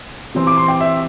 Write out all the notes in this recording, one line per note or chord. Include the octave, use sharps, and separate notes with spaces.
C3 E3 C4
D6
C6
G5
E5